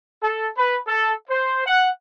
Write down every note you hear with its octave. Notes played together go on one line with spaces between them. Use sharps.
A4
B4
A4
C5
F#5